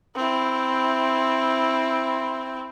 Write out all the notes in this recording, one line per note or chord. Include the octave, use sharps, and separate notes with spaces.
C4 E4